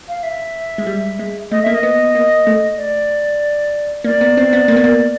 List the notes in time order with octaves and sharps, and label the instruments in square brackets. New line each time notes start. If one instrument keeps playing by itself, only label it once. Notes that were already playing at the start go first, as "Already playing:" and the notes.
[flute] F5
E5
[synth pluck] G#3
G3
G#3
[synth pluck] A3 [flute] D#5
[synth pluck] A#3 [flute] E5
[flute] D#5
[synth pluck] B3
A#3
A3
[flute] D5
[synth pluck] A#3 [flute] D5
[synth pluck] B3
C4
B3
A#3
B3
A#3